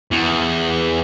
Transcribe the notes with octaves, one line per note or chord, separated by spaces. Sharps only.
E2